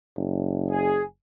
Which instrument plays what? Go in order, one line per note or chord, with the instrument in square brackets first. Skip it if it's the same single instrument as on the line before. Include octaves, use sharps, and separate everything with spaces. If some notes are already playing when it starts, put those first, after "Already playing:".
[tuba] F#1
[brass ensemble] G#4